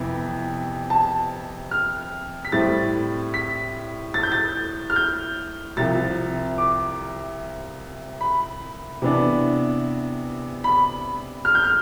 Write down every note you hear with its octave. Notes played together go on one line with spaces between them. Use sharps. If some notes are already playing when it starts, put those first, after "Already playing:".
Already playing: F2 C3 E3 B3
A5
F6
B6
A2 G3 C4 A6
B6
A6
G6
A6
F6
G6
C2 C3 F3 A6
D6
B5
C3 E3 B3 D4
B5
F6
G6
F6